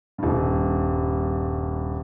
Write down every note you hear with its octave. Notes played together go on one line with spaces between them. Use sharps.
D#1 G2